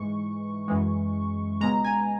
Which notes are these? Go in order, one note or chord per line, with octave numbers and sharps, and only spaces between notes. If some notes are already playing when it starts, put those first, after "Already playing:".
Already playing: G#2 E3 G#3 C#6
F#2 E3 G#3
C#2 B2 G#3 A#5
G#5